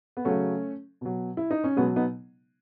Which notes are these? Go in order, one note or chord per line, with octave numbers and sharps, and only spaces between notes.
B3
C#3 F#3 A3 C#4
B2 F#3
E4
D#4
C#4
B2 F#3 G#3 B3
B3 D#4